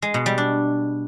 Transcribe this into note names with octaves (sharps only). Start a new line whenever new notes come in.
G#3
B2
G3
D4